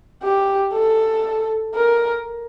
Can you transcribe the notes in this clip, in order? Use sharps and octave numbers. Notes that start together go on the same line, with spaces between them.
G4
A4
A#4